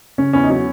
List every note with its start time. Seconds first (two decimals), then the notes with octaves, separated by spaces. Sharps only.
0.18 C#3 C#4
0.33 E2 C#4
0.43 D#4
0.49 F#3 C#4